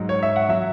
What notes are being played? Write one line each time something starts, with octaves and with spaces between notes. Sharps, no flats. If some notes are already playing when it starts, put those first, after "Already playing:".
Already playing: G#2 F#3
C#5
E5
F#5
F#3 E5